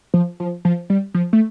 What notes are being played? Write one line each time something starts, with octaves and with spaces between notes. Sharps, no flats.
F3
F3
F3
G3
F3
A3